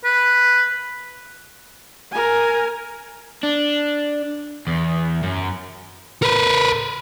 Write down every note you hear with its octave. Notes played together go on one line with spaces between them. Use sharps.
B4
A#4 G#5
D4
E2
F#2
A#4 B4